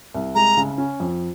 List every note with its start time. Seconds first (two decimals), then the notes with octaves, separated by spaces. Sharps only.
0.14 C2
0.35 G#3 A#5
0.57 C#3
0.78 C#4
1.00 F2